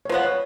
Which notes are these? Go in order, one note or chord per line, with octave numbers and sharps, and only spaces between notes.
C#5
F3 G#3 B3 B4
C#5